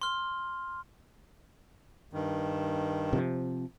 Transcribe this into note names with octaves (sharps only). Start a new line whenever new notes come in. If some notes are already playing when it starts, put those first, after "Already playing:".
C6 F6
G2 D#3
C3 F3